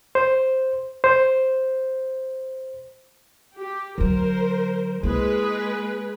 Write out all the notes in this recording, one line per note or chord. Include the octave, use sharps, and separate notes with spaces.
C5
C5
G4
D3 F#3 A#4 C5
G#3 A#3 E4 G#4 B4